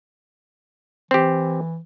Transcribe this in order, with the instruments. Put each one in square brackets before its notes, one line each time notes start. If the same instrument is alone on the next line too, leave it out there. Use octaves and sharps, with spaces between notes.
[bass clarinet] E3 [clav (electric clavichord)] C4 G4